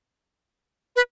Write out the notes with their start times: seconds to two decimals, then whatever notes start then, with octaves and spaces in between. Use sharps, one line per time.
0.96 B4